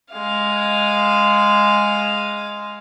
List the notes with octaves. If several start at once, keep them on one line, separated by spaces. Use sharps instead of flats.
G#3 F5